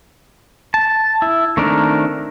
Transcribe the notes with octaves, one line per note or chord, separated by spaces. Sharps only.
A5
E4
D#3 A3 C4 D4 A#4